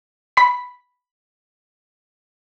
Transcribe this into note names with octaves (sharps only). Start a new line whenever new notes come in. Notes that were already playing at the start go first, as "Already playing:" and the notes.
B5 B6